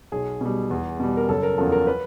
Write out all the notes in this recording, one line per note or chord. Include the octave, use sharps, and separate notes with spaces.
B1 G#4
B2 G3
E2
B2 G3
A#4
F#1 A4
A#4
E2 C#3 F3 A4
A#4
B4